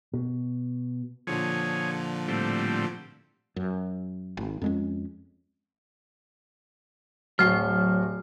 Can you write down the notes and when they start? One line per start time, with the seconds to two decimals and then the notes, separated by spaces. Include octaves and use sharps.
0.14 B2
1.27 A#2 D3 F3 G#4 C#5
2.28 A2 G3 C4
3.56 F#2
4.37 G#1
4.62 F2 G#3 C#4
7.39 D1 F#3 F#4 F6 C7